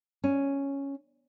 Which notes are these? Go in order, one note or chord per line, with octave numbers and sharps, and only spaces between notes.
C#4